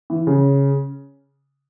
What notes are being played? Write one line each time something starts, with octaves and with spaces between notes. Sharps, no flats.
E3
C#3